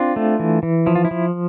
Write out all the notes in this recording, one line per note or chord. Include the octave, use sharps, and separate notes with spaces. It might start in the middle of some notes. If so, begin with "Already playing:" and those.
Already playing: C4 D4 F4
A3
E3
E3
F3 E4
F4
E4
F3